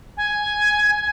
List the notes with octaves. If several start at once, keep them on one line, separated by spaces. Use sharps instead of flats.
G#5